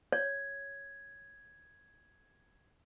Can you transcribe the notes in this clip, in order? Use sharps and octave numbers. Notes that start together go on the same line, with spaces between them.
C#5 G#6